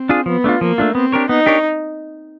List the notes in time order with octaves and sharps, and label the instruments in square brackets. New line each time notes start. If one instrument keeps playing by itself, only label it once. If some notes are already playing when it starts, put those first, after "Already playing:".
Already playing: [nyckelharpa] C4
[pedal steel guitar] D4 F4 G#4
[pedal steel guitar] F3 [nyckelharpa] B3
[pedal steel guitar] A3 D4 F4
[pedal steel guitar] F3 [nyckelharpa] A#3
[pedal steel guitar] A3 D4 F4
[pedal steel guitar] B3 [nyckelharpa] C4
[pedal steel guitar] D4 G4 A#4 C#5
[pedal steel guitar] B3 [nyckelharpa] D#4
[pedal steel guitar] D4 G4 A#4 C#5